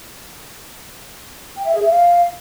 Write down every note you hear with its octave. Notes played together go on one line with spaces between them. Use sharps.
G5
E5
G#4
E5
F5